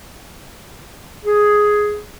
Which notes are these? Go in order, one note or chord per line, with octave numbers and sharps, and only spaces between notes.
G#4